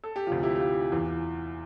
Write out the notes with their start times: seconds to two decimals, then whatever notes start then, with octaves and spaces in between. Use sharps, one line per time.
0.04 A4
0.16 G4
0.27 D2 C3 F3 F4
0.43 E4 G4
0.55 G4
0.60 F4
0.92 E2 E3